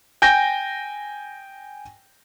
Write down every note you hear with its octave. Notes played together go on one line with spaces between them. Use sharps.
G5 G#5 G6 A#6